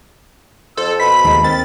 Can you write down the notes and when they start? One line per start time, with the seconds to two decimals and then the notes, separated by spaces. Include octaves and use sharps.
0.77 F2 A4 C5 E6
1.00 B2 B5 B6
1.25 D#2 G#3 D#4
1.44 C4 A#4 A6